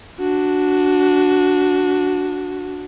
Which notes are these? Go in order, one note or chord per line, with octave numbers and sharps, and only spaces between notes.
D4 F#4